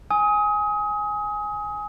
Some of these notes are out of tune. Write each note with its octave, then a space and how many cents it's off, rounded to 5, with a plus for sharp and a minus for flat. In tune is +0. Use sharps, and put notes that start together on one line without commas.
G#5 +0 D#6 +30